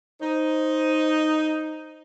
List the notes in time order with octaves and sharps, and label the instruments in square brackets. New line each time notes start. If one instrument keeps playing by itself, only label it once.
[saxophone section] D#4 [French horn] C5